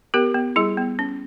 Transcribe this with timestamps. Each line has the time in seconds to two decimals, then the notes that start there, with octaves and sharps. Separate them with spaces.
0.14 B3 G4 A#4
0.35 B3
0.56 G3 E4 G#4
0.77 B3
0.99 C#4